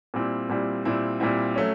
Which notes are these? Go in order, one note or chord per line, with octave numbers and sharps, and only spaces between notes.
A#2 G3 C4 E4
A#2 G3 C4 E4
A#2 G3 C4 E4
A#2 G3 C4 E4
F#3 A3 C#4